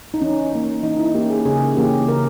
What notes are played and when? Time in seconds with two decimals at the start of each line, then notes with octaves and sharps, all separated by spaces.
0.14 D#4
0.21 E3 C#4
0.52 A#3 C#4
0.83 E3 D#4
0.99 E4
1.15 A#3 C#4 G4
1.30 G#4
1.45 C#3 G#4
1.77 E3 A#3 C#4 G4
2.08 C#3 A#4